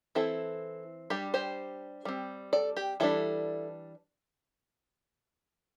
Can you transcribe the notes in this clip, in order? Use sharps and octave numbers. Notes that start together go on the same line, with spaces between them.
E3 C4 E4 A4
G3 D4 G4
G4 C5
G3 C4
A4 D5
G4
E3 G3 D4 E4 A4